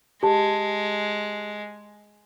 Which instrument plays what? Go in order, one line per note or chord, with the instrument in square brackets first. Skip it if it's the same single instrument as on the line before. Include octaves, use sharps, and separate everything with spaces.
[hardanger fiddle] G#3 [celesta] G4 A5